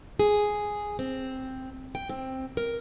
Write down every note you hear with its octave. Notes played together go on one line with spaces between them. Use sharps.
G#4
C4
G5
C4
A#4